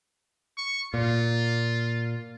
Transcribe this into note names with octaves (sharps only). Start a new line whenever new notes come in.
C#6
A#2 F4